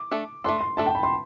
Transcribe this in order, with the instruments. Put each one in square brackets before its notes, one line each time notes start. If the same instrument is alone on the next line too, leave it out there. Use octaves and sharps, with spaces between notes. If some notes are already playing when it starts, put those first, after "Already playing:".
Already playing: [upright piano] D6
[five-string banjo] A3 D4 A4
[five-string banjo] A3 D4 A4 [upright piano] C6
[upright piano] C6
[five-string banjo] A3 D4 A4 [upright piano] A5
[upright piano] G5
B5
C6